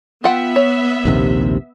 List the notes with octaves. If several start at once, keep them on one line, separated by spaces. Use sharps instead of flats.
B3 F4 E5 F#5 G5
C#5
A#1 D#2 C3